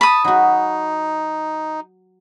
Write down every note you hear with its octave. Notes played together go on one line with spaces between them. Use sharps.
A5 B5 D#6
F#3 D#4 F#4